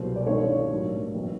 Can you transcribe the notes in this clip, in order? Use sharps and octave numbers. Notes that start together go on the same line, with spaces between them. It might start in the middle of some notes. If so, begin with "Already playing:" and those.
Already playing: C2 B2 F#3 A#3 C5
D5
G#1 G2 E3 C#5
A2 F#3 A#3 D4
A1 A2 F#3 B3